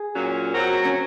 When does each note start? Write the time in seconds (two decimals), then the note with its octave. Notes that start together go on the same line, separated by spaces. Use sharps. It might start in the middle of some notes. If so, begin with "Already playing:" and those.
Already playing: G#4
0.13 A#2 F#3 C#4
0.54 F#3 C4 F#4 A#4
0.85 C#4